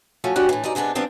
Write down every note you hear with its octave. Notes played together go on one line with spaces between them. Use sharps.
F3 A3 C#4 F#4
G3 C#4 D4 F#4 G4 F#5
A2 E3
F#2 G3 D#4 D5
C3 G#3 B3 D4 B4
D#3 F3 B3 C4 D4 G4